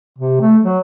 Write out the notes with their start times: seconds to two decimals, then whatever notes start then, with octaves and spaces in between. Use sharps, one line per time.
0.19 C3
0.41 A3
0.64 F#3